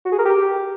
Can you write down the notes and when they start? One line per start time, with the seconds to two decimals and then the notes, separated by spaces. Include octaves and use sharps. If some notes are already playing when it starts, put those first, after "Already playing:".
0.05 F#4
0.12 G#4
0.19 A#4
0.26 G4